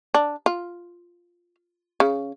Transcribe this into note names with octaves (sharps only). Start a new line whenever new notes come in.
D4
F4
C#3